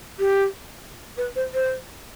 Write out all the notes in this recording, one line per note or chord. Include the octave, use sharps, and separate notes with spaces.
G4
B4
C5
C5